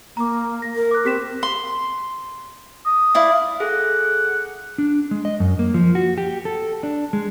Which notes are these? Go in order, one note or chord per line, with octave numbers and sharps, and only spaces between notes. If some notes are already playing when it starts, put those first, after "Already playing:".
A#3 A#5 D6
A#6
A#4
D6 F#6
C4 G4 B6 E7
C6
D#6
E4 D5 F5
G#4 A4 F#5
D4
G#3
D#5
F#2
A#3
F3
F#4
G4
A4
D4
G#3